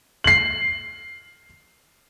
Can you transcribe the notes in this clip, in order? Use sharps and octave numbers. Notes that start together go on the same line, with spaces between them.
C7 F#7